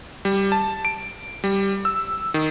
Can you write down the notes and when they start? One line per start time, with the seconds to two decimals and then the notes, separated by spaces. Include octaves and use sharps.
0.25 G3
0.52 A5
0.85 D7
1.44 G3
1.85 E6
2.34 D#3